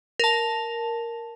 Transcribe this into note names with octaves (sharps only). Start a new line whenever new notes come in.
A#4 A5